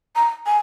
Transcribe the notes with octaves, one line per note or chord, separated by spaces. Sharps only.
A#5
G#5